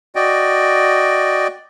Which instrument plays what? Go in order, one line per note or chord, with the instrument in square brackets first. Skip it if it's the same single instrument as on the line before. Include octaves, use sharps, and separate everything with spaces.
[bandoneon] F#4 D5 D#5 G5